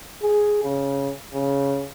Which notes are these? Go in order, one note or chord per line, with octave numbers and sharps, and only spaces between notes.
G#4
C#3
C#3